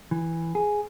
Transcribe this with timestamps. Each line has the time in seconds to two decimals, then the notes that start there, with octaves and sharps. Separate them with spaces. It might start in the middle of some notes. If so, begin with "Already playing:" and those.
0.11 E3
0.55 G#4